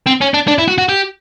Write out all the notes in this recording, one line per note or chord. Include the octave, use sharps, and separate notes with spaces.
C4
C#4
D4
D4
E4
F#4
F#4
G4